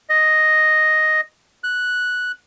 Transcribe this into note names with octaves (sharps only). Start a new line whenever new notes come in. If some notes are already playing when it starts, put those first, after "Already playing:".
D#5
F#6